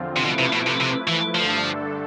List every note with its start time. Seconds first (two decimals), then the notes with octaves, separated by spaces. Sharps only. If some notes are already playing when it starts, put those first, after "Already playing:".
Already playing: E2 D3 F3 C4 F4
0.17 C3
0.25 B2 F3 A3 E4 B4
0.39 C3
0.52 B2
0.66 C3
0.80 C3
1.08 E3
1.35 G2 D3 F3 A3 D4 A4